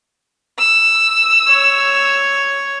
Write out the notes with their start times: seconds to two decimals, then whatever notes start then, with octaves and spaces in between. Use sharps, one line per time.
0.59 E6
1.48 C#5